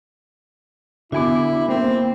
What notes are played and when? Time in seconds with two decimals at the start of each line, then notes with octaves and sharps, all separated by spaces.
1.12 D3 B3 E4 F#4 G#5 D6
1.69 A#3 C4